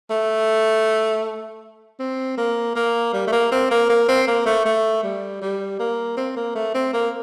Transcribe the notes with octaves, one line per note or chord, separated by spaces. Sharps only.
A3
C4
A#3
A#3
G3
A3
A#3
C4
A#3
A#3
C4
A#3
A3
A3
G3
G3
A#3
C4
A#3
A3
C4
A#3